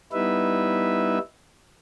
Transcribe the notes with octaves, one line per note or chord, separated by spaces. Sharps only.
G3 B3 D#4 E4 B4 E5